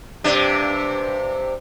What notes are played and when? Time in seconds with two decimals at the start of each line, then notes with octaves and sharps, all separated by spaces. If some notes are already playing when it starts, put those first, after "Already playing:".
0.24 G2 C3 D4